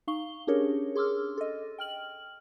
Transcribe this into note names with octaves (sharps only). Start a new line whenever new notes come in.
D#4 F5 C#6 G7
C#4 D4 G4 G#4 A#4 C#5
G#4 C6 D6 E6 F6
A4 D#5
G5 F6 F#7